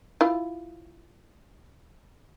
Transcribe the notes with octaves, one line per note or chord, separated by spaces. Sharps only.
E4 F4